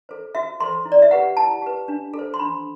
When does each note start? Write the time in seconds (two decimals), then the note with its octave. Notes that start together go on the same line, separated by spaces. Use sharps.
0.09 A4 C5
0.35 F#4 E5
0.60 A4 C5 C6
0.85 E4
0.92 D5
1.02 E5
1.11 G4 B4 F#5
1.37 E4 A5
1.62 G4 B4
1.88 D4
2.14 A4
2.19 C5
2.34 C6
2.39 D4 B5